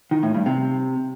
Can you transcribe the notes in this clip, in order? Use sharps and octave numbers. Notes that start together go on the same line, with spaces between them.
D#3
A2
G2
C3